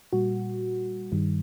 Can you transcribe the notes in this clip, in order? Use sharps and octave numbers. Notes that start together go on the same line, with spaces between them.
A#2 G3 F#4
G2 D#3 G3